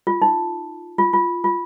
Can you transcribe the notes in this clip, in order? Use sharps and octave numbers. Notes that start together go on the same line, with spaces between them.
F4
D#4
F4
F4
F4